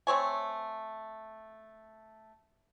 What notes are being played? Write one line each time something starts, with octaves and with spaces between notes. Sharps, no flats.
A3 C4 C#5 G#5